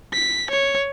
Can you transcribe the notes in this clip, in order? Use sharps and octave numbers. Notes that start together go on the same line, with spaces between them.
B6
C#5